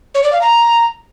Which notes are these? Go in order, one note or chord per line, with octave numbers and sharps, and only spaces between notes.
C#5
D5
F5
A#5